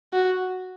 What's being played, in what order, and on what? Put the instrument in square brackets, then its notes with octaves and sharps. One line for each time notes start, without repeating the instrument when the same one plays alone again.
[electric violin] F#4